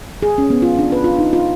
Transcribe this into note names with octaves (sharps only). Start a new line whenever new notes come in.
G#4
C#4
B3
F4
D4
B4
F4
D#4
F4